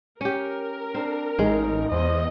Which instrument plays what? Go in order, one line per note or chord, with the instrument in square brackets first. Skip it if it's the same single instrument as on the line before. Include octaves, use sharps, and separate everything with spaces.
[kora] C#4 G4 [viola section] A#4
[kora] C4 [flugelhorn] D4
[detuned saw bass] A1 [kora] G#3 [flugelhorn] D#4
[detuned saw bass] E2 [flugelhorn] C5 [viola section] D#5